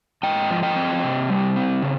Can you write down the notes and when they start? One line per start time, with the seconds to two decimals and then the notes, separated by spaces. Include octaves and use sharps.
0.23 G#2 D#5 G5
0.50 F3
0.63 D#5 G5
0.76 C4
1.03 C3
1.30 G3
1.56 C4
1.82 C#3